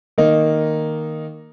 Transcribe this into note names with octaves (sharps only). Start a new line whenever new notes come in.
D#3 A#3 D#4